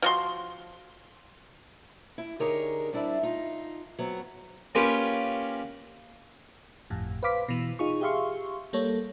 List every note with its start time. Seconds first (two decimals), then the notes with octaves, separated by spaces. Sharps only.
0.02 F3 F#4 C6
2.18 E4
2.40 D3 D#4 G4 G#4 A#4 C#5
2.93 G3 C4 D4 E4
3.23 D#4 F4
3.99 F#3 B3 C4
4.75 A#3 C#4 F4 G4 B4
6.90 G1 F2 A2
7.23 B4 C5 F5 D6 B6
7.49 B2 E3
7.79 D#4 F4 G#4 C#6
8.01 G4 G#4 E5 F5 C6 C#6
8.73 G3 A#3 A4 C#5